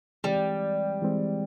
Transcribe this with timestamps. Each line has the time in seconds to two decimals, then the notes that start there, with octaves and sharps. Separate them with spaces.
0.24 E3 G3 G#3 C4
1.02 E3 G#3 C4